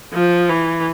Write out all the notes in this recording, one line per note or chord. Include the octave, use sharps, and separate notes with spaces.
F3
E3